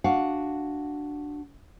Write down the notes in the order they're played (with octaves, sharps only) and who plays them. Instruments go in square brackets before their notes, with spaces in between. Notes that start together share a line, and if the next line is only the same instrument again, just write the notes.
[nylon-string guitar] D4 F#4 F5 F#5